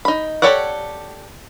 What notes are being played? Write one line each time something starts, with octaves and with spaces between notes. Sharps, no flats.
D#4 B5
G4 A4 C#5 D5 F#5